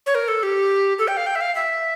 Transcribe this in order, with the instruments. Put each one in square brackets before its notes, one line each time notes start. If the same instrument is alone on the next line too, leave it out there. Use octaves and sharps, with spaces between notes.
[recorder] C#5
A#4
A4
G4
A4
G5
F5
G5
E5
F5
E5